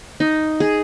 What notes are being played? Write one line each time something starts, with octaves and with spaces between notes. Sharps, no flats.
D#4
G#4